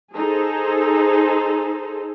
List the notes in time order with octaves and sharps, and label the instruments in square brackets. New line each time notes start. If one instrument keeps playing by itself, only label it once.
[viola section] D#4 G#4 A4 C5